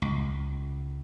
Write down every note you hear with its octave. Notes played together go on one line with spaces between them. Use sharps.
C#2